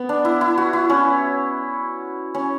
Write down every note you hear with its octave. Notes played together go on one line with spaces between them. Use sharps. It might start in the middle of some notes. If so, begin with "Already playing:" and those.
Already playing: B3
D4
E4
E4
F#4
E4
C#4
C#4